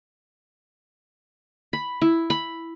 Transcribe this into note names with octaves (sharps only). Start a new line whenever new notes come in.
B5
E4
B5